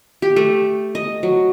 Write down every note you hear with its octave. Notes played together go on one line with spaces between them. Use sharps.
G4
A3
D#5
F#3